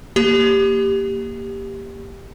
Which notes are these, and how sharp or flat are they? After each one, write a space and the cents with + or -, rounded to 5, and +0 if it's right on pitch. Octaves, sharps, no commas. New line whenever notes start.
A#3 +0 G4 +5